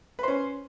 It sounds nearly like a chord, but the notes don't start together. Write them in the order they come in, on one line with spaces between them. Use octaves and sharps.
B4 C5 C#4